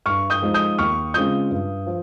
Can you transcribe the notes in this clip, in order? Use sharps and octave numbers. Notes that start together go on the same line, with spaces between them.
G2 C#6 F6
D#6 G6
F3 G#3 D#4
D#6 G6
D#2 C#6 F6
C#3 G#3 C4 F4 D#6 G6
G2
F3